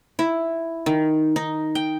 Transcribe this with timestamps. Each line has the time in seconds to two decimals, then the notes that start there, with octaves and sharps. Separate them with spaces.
0.19 E4
0.86 D#3
1.36 D#4
1.75 G5